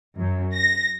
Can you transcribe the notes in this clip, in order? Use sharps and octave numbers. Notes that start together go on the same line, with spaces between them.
F#2
A#6